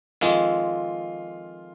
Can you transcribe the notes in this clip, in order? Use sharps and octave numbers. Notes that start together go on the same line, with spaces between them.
F2 D#3 G#3 F4